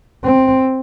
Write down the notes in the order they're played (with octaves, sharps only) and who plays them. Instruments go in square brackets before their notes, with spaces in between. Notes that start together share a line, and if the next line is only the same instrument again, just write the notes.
[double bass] C4